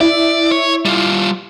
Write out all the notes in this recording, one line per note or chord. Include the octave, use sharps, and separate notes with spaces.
E4 D5
C#5
G3 F4